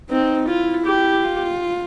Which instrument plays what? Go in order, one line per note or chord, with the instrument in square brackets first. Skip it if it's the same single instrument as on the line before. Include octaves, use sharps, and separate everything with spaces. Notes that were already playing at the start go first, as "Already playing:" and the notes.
[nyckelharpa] C4 [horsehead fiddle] D#4
[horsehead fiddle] E4 [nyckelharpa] F4
[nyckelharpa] G4
[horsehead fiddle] F4